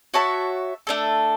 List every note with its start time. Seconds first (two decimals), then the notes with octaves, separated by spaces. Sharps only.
0.14 F#4 C#5 E5 A5
0.87 A3 D4 A4